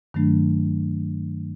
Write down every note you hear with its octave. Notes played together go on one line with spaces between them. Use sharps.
G2 D#3 F#3 A3 D4